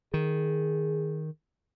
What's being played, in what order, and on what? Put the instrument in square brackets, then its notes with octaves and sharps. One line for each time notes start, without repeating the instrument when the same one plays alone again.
[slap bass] D#3 [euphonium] G#4